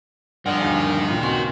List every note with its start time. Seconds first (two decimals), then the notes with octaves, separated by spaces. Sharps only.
0.46 G2 F3 G#3 A#4 D5 D#5 F#5
0.61 D#2 D3 G#3 F#5
1.08 D#2 A#2 C#3 G#4
1.23 C4 F#4 B4